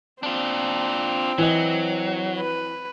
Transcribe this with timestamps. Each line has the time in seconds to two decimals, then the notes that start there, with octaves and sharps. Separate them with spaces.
0.23 C4 D4 F4
1.38 E3 F#3 D#5
2.38 B4